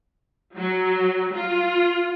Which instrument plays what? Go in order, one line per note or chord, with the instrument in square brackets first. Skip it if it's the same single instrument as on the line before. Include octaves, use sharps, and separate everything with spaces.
[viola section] F#3
F4